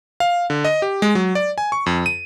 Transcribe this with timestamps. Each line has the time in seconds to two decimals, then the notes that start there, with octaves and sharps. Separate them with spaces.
0.20 F5
0.50 D3
0.65 D#5
0.82 G4
1.02 G#3
1.15 F#3
1.35 D5
1.58 G#5
1.72 C#6
1.86 F2
2.06 D#7